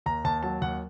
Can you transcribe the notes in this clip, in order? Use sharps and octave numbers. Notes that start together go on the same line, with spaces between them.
D#2 A#5
D#2 A5
F#3 A5
D#2 F#5